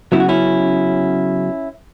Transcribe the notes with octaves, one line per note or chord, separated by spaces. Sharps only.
C#3 F#3 B3 E4
F#4
C#4 E4